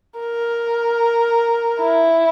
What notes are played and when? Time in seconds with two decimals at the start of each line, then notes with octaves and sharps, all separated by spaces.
0.20 A#4
1.81 E4